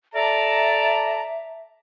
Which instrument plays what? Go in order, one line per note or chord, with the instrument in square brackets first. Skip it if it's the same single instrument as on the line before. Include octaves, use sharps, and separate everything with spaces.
[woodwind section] A4 D5 A#5 [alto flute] E5 [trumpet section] A5